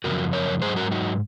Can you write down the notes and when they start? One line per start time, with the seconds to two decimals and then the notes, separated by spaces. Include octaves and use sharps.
0.04 F#2 C#3 F3 F#4 A#4
0.33 A#4 C#5
0.62 G#2 F#3 G#4 C5
0.76 F#4 A#4
0.91 D#4 F#4